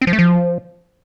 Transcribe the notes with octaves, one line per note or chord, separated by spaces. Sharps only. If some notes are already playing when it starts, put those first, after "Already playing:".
C4
F3
A3
F3